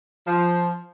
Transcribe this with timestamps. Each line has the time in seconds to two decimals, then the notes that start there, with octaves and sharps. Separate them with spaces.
0.28 F3